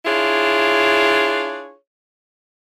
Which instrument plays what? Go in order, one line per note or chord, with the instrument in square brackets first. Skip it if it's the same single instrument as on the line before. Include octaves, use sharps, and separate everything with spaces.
[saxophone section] D4 E4 F4 G#4 C#5